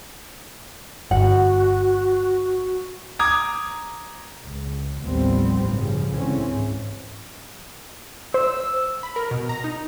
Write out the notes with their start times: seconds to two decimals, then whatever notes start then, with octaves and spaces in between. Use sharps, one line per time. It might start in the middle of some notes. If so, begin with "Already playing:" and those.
1.11 G1 F#4 F#5
3.19 A#5 D6 D#6 G#6
4.44 C#2
5.02 A1 D#2 F3 G3 B3 C4
5.66 G2 C#3 F3
6.11 G#1 C#2 D3 E3 C4 C#4
6.43 G#2
8.34 C5 E6
9.03 B5
9.16 A#4
9.31 B2
9.49 A#5
9.64 D#4